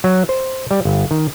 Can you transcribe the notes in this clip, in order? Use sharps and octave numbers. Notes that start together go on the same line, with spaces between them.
F#3
C5
G3
G1
D#3